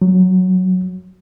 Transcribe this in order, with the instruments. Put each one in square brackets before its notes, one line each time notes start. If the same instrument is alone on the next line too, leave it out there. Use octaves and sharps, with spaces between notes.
[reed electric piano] F#3